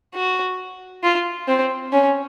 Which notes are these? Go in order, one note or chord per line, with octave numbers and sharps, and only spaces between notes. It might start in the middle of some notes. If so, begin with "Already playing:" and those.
F#4
F4
C4
C#4